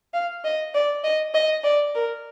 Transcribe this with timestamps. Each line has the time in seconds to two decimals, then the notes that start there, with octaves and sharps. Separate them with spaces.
0.14 F5
0.45 D#5
0.75 D5
1.04 D#5
1.34 D#5
1.64 D5
1.95 A#4